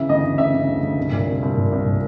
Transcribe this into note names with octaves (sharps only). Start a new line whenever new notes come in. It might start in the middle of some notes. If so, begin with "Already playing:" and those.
Already playing: C#3 E3 E5
D2 D#5
D2
C#3 E5
C#3
D2
D2
C2
A#2
C2
C2
A#2
C2
A#2